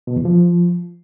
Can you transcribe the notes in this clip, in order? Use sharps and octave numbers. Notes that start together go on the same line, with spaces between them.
B2
E2
F3